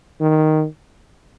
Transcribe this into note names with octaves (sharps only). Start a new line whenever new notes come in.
D#3